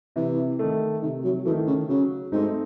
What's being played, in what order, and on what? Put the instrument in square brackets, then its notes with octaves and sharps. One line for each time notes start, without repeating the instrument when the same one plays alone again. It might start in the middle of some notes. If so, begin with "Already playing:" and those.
[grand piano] C3 [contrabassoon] E3
[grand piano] D#3 A3
[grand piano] C3 [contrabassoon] D#3
[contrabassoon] F#3
[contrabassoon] E3 [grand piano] A3
[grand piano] D#3
[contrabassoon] C#3
[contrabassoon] C#3 [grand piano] F#3
[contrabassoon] G#2 [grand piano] A3 C4 D#4